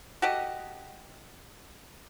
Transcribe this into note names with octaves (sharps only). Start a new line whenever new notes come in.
F#4 G4 A4 D#5